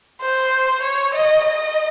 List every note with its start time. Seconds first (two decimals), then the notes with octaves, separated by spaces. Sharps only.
0.22 C5
0.83 C#5
1.15 D#5
1.44 D#5